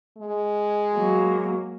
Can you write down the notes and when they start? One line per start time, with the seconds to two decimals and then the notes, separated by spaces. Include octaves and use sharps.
0.17 G#3
0.94 F#3 A#3